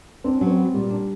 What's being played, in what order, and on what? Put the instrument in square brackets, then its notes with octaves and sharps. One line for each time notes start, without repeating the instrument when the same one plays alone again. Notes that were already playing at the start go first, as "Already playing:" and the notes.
[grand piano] C4 [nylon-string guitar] D4
[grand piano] C#4
[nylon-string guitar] F#3
[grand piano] C4
[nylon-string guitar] B3
[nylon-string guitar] A#2 [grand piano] G3
[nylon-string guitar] D4